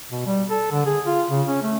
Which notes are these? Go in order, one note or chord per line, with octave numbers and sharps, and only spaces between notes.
B2
G3
A4
D3
G#4
F4
C#3
C#4
A3